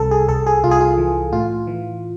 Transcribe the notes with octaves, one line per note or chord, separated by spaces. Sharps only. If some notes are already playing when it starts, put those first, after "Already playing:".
Already playing: C2 A4
G#4
C2 A4
G#4
C2 F4
G#4
F4
E3
A2 F4
E3